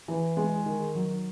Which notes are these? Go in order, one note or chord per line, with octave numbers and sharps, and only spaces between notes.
E3
G#3
D#3
F#3